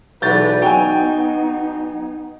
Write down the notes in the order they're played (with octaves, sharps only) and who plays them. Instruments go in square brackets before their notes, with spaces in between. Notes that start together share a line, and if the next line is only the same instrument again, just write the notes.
[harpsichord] B1 E2 B2 [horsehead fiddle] B4 D5 [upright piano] G6 A6
[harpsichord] F#3 [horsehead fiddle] B3 D#4 [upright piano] G5 G#5